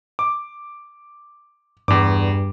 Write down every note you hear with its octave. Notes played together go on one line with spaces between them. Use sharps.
D6
E2 G2 D6